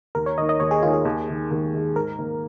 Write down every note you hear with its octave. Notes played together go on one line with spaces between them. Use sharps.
D#2 A#4
C#5
D#3 A#3 D#4 D#5
D#5
D#2 C#5
G#4
D#3 A#3 D#4 F4
G#4
D#2
D#3 G#3
D#2
D#3 G#3
G#2 A#4
D#3 A#3